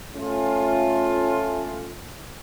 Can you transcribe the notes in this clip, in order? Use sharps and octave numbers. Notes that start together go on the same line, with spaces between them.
A3 C#4 F4